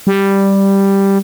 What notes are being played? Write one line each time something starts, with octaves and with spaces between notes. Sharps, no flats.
G3